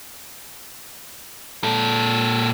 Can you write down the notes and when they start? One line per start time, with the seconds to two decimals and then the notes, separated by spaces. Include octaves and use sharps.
1.63 A#2 A4